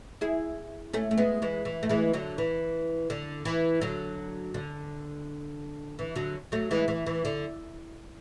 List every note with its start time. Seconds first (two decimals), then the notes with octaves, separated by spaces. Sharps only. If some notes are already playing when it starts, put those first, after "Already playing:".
0.21 E4 G#4
0.93 A3 C#4
1.11 A3
1.18 G#3 B3
1.42 E3 G#3
1.65 E3
1.83 A3
1.89 E3 G#3
2.13 D3 F#3
2.38 E3
3.10 D3
3.45 E3
3.81 D3 F#3
4.54 D3
5.99 E3
6.15 D3 F#3
6.52 F#3 A3
6.71 E3 G#3
6.88 E3
7.06 E3
7.25 D3